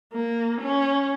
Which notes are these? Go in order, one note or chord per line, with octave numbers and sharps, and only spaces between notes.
A#3
C#4